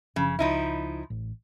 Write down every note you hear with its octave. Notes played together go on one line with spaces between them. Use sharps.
F#1 C#3 F3
C#2 F3 D#4 E4
A1